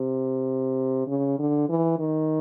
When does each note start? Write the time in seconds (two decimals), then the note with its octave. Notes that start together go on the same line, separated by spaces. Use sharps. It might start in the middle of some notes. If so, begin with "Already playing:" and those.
Already playing: C3
1.07 C#3
1.39 D3
1.69 E3
1.99 D#3